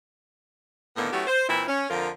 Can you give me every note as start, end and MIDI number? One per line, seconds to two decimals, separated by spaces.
0.97 1.10 45
0.97 1.10 50
0.97 1.10 51
0.97 1.10 58
0.97 1.10 59
1.12 1.24 54
1.12 1.24 57
1.12 1.24 59
1.12 1.24 61
1.12 1.24 64
1.12 1.24 67
1.27 1.49 72
1.49 1.63 46
1.49 1.63 52
1.49 1.63 60
1.49 1.63 64
1.68 1.89 61
1.90 2.10 41
1.90 2.10 50
1.90 2.10 53
1.90 2.10 65
1.90 2.10 70